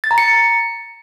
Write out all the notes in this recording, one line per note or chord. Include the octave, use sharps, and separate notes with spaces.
A6
A#5
C#7